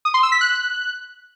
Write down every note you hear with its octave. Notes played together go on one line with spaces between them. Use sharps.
D#6
C6
E6
B6
F#6